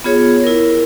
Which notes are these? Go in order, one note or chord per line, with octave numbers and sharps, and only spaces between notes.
B3 F4 G#4 C#5
E4 A#4